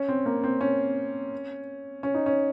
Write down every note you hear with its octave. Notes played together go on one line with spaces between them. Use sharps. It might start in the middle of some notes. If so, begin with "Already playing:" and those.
Already playing: C#4
C4
A#3
C4
C#4
C#4
D#4
C#4